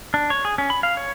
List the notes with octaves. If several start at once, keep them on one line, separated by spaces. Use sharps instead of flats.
D4
C#5
G#4
C#4
B5
F5
C#5